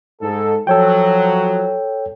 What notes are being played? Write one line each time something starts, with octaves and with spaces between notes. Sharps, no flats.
G#2 A4
F3 F#3 A4 C#5 G5